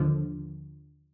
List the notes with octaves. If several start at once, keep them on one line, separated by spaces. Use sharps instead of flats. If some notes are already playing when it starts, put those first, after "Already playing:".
Already playing: D#2 D3 F3